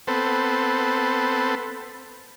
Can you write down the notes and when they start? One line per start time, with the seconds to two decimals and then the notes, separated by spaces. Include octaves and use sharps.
0.07 B3 C4 A4